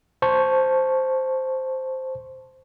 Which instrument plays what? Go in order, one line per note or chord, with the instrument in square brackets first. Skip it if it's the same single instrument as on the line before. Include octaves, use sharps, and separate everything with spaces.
[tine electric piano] C5 A5 C#6